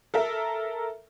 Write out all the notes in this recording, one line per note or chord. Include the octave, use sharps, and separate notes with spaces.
A4 A#4 E5